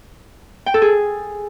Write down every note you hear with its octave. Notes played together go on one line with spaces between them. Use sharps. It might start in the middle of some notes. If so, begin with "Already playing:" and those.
G5
A4
G#4